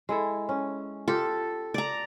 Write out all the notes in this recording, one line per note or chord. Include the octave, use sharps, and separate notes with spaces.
G#3 E4 A4
C#4
F4 G4 A4
D5 A#5